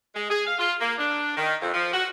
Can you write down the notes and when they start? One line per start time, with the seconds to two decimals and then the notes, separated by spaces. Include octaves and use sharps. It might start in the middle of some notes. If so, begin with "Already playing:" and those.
0.14 G#3
0.30 G#4
0.47 F5
0.59 F4
0.80 A#3
0.98 D4
1.37 D#3
1.61 F2
1.74 F3
1.94 F#4